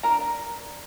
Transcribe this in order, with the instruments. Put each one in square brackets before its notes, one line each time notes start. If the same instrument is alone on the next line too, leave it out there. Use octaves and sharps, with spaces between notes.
[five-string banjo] D4 A#4 A#5